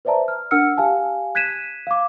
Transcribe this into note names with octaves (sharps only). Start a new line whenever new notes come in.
B4 C5 D5 E5 A5 A#5
F6
D4 A#4 F#5 E6 F6 C#7
G4 F5 G#5 A5
F#6 G#6 B6 D#7 E7
F5 D6